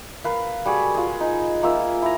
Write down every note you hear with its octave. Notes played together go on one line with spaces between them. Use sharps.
A#4 B4 F5
G3 F#4 G#4 B5
F4 G#4
D#4
A#3 F4 E5 E6
E4 A#5